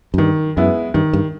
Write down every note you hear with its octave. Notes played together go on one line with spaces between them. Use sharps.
F#2
G2 D#3
F#2 G#3 B3 E4
G2 D#3
G2